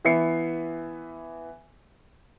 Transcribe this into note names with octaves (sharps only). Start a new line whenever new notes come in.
E3 B3 E5 C7 C#7